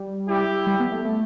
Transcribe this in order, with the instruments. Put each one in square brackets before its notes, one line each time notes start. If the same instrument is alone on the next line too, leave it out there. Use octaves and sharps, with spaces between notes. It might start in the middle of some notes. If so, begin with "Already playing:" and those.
Already playing: [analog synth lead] G3
[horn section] E4 G4
[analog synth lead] G3
B3
A3
A3